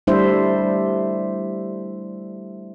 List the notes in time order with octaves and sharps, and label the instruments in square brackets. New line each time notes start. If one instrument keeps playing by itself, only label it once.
[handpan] G3 A3 D4 E4 C5 E5